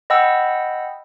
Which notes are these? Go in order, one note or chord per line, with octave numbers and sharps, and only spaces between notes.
D#5 F#5 G5 B5 E6